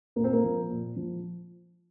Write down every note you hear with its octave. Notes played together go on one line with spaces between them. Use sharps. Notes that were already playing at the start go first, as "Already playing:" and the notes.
A#2 A#3
C4
A#3
F3
A#2
F3